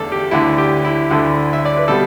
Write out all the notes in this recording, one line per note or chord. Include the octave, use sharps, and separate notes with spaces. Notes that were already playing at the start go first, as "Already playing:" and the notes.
Already playing: E2 D3 A3 A4 D5
G4
D2 D3 A3 E4
G4
E4
D2 D3 A3 E4
E5
D5
B4
B2 G3 A4